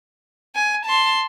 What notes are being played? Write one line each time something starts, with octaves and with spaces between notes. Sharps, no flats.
G#5
A5 C6